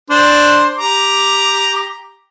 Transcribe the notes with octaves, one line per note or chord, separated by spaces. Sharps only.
D4 C5
G4 A#5 D6